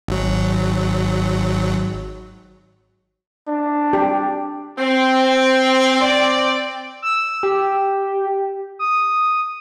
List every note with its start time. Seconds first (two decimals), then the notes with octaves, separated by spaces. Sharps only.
0.08 G#1 F#3
3.48 D4
3.93 G4
4.78 C4
6.00 C4 D5
7.02 E6
7.43 G4
8.79 D#6